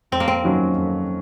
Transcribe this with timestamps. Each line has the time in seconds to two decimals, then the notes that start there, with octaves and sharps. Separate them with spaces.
0.12 F2 C4
0.20 A#3
0.28 C4
0.43 D#3 F#3 C#4 F4
0.75 F2